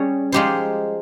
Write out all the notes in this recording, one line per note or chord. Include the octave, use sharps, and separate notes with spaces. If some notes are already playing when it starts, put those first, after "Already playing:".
Already playing: G3 C#4 G#4 C#5
F3 G#3 D#4 G4 C5